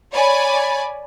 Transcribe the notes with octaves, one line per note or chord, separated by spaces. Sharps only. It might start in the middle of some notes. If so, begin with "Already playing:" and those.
C#5 D5 G#5 B5